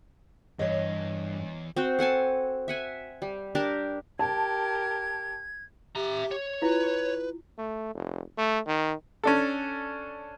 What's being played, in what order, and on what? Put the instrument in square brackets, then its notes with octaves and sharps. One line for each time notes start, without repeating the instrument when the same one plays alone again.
[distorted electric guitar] E2 [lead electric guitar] G2 [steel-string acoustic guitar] C#5 D#5
[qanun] C4 F#4 C5
A4 F#5 G#5 A5
E5 F#5 G#5
G3
D4 G4 A#4 A5
[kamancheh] G4 A#4 [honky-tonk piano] A5 [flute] G#6
[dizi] G4 [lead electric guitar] E5 A#5
[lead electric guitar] C#5
[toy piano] E4 F4 [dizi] B4
[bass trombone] A3
F1
A3
D#3
[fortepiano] C#4 D4 A4